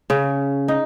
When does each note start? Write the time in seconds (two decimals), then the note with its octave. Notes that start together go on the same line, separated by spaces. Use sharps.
0.10 C#3
0.68 D#4